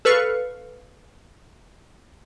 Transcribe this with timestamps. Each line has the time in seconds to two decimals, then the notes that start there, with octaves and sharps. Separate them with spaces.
0.05 A4 B4 F5 C#6